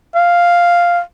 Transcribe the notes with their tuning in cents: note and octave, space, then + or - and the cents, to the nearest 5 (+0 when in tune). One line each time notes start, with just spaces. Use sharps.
F5 +0